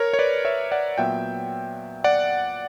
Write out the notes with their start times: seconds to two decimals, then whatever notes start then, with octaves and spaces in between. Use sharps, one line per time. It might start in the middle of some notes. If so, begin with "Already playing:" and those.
Already playing: A#4 C#5
0.13 C#5
0.19 B4 D5
0.45 C#5 E5
0.71 D5 F#5
0.98 A#2 F#3 B3 E5 G5
2.04 D5 F#5